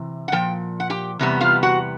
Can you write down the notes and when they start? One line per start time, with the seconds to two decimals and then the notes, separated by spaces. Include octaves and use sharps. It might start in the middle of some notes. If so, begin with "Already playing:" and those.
Already playing: C3 E3
0.28 F#5
0.32 A#2 F3 G5
0.80 F#5
0.90 G4 G5
1.19 E2 C3 G3 B3
1.41 F4 F5
1.63 F#4 F#5